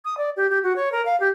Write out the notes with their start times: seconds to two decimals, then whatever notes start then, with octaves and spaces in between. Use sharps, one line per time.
0.05 D#6
0.17 D5
0.37 G4
0.50 G4
0.63 F#4
0.76 C#5
0.92 A#4
1.05 F5
1.20 G4